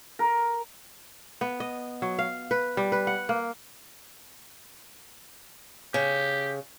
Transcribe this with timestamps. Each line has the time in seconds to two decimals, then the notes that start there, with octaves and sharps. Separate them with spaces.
0.19 A#4
1.41 B3
1.60 D#5
2.02 F#3
2.19 F5
2.51 B4
2.77 G3
2.92 B4
3.07 F#5
3.29 A#3
5.94 C#3 G4